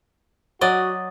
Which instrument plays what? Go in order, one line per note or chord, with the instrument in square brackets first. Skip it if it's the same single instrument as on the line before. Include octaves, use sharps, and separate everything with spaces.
[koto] F#3 D5 D#5 [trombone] F#4